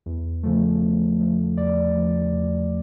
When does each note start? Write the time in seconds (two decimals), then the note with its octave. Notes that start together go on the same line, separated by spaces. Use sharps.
0.06 E2
0.43 C#3 F3 A3
0.82 E2
1.20 C#3 F3 A3
1.57 E2 D5
1.95 C#3 F3 A3
2.34 E2